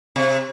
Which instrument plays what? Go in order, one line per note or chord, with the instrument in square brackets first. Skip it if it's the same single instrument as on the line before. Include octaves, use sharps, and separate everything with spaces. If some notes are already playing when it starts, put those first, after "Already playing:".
[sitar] C3